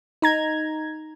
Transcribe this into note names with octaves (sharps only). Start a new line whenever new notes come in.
D#4 A#5 G#6